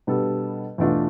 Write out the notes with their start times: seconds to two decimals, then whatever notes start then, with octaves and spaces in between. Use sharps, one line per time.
0.07 B2 G3 B3 D4 A4
0.78 E2 B2 A3 D4 F4